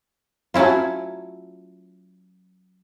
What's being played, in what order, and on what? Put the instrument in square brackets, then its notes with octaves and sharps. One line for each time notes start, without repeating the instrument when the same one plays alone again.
[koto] F#3 A3 C#4 E4 F4